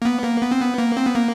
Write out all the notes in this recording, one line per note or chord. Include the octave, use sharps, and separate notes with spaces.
A#3
B3
A#3
B3
C4
B3
A#3
C4
B3
A#3